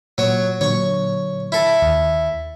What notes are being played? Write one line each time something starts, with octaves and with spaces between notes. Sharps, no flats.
A#2 F#3 C#5
A#2 D3 F#3 C#5 C#6
E4 A4
D#2